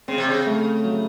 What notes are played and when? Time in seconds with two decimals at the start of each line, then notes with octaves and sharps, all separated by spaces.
0.08 C#3 C4
0.18 C3
0.29 C#3
0.47 A3
0.85 F#3